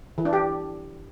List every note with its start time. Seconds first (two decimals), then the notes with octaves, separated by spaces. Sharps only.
0.18 E3
0.25 D4
0.33 G4